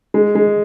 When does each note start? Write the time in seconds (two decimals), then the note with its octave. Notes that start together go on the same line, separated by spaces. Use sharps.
0.14 G#3
0.35 G#3